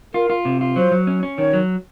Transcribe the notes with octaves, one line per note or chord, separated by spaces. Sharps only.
F4 A#4
F4
C3
F4
F#3 C5
F#3
C#4
C#4
D#3 C#5
F#3